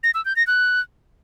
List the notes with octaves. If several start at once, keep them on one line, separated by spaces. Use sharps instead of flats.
A#6
E6
G6
A#6
F#6